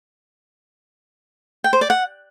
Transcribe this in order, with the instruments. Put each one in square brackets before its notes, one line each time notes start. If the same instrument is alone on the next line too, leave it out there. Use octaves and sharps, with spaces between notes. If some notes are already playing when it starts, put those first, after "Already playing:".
[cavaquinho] G5
C5
D5
F#5